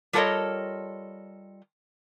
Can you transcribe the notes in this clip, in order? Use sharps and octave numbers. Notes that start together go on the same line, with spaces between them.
G3 F4 A4 A#4 C#5 D#5